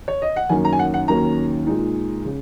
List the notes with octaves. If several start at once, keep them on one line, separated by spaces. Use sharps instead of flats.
C#5
D#5
F#5
F#2 D#3 A#3 C#4 G#5
A#5
G#5
F#5
F#5
D#2 D#3 F#3 A#3 C#4 A#5
A#2 G#3 D#4
C#3